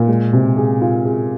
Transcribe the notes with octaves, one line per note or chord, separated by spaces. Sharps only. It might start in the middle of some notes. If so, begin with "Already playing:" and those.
Already playing: A#2
G#3
C3
G#4
F4
G#4